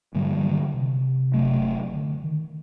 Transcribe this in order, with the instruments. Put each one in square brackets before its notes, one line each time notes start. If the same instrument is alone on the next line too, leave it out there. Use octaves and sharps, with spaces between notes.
[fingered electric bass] G2 D3 G3 A#3 [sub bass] F#3
[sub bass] F#3
D#3
D3
C3
[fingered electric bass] F#1 F#2 F#3 A3
[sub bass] D3
D#3